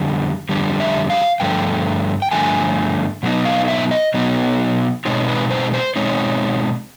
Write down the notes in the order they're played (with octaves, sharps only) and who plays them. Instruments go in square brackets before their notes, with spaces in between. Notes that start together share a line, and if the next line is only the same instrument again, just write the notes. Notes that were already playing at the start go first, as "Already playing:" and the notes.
Already playing: [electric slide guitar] F2 D3 G3
F2 D3 G3
E5
F5
G2 D3 F3 A3 G5
G5
G2 D3 F3 A3 G#5
B2 F#3 B3 D#4
F5
E5
D#5
B2 F#3 B3 D#4 D#5
B2 G#3 C4 D#4 C#5
B4
C5
C5
B2 G#3 C4 D#4 C#5